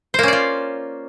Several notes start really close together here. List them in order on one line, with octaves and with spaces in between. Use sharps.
C5 A#3 C#4 D5 F4